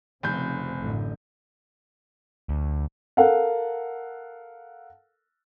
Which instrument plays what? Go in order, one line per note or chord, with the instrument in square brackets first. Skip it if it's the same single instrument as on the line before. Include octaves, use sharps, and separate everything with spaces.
[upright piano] F1 G6 [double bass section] F2 C#3 C4
[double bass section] A1 F#2 D3
[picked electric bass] D2
[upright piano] A4 A#4 F5 F#5